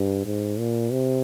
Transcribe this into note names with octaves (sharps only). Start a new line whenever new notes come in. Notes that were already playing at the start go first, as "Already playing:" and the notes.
Already playing: G2
G#2
A#2
C3